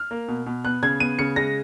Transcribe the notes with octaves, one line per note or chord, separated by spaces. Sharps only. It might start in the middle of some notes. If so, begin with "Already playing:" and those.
Already playing: F6
A#3
B2
B2
B3 F#6
C#3 G#6
B3 D#7
C#3 C#7
G#3 A#6